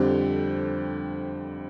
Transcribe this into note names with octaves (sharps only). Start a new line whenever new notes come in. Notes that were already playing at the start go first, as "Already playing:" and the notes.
Already playing: F2 D3 G3 C4 G4